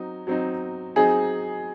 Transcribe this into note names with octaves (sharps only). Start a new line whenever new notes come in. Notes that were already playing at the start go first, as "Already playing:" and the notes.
Already playing: F#3 C4 D#4
F#3 C4 D#4
F#3 C4 D#4 G#4